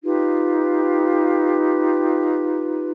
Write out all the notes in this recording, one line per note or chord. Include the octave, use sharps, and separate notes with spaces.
D#4 F4 G4 B4